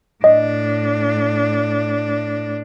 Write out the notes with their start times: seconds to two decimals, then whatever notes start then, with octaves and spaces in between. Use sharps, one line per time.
0.24 A2 D4 D#5